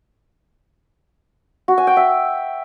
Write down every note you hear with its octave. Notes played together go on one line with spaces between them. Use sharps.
F#4
G#5
G5
E5